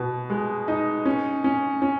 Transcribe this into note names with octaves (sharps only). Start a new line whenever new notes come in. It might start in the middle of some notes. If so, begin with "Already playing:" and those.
Already playing: B2
G#3
D#4
C#4
C#4
C#4